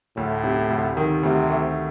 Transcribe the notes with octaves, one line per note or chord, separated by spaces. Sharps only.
D2 A2
C3
D2
D#3
D2 C3
A3